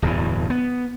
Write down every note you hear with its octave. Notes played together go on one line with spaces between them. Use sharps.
D1 E2 G2 E3
B3